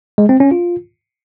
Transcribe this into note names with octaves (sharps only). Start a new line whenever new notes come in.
G#3
C4
C#4
F4